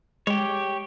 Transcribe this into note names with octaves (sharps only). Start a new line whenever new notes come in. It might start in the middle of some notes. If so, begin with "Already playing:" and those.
G#3 G4 C#5